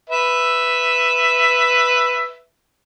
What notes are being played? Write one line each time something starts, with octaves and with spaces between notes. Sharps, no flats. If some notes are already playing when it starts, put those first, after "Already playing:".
B4 E5